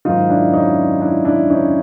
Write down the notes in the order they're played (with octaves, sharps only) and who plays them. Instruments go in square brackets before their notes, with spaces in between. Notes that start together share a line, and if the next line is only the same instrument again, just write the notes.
[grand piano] G#2 D#3 F#3 D#4 F4
D4 E4
C#4 D#4
D4 E4
D4 E4
C#4 D#4